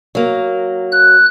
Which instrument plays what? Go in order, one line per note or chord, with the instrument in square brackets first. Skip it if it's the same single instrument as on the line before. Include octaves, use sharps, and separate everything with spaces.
[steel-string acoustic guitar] F#3 A#3
[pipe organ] F#6